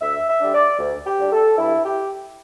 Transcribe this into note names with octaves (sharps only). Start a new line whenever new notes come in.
D2 E5
E5
D3 G3 D4
D5
D2
G4
D3 G3 D4
A4
G2 E4
G4